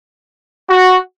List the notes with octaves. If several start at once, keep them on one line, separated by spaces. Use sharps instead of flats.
F#4